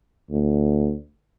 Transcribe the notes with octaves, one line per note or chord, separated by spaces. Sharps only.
D2